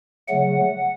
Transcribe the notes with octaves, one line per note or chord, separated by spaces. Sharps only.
C#3 F#3 A3 F#5